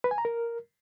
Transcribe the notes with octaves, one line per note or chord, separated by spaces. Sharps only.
B4
G#5
A#5
A#4